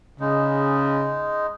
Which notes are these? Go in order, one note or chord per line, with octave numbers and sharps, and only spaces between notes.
C#3 G#3 D#4